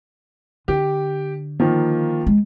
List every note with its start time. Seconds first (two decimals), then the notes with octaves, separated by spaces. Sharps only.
0.68 D3 G4
1.60 D#3 F3 A#3
2.27 G#3